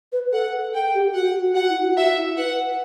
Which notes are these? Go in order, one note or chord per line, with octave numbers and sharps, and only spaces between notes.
B4
A4 F#5
A4 G5
G4
F#4 F#5
F#4
F#4 F#5
E4
F#4
F#4 E5
E4
B4 F#5